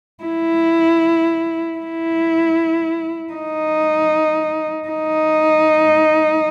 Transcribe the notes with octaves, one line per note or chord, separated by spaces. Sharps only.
E4
E4
D#4
D#4